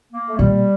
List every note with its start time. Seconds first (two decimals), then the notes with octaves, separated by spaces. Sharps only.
0.13 A#3
0.29 A3
0.38 A#2 G3